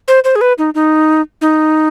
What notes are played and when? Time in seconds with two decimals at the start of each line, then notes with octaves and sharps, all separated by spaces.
0.08 C5
0.24 C5
0.36 G#4
0.41 B4
0.58 D#4
0.75 D#4
1.41 D#4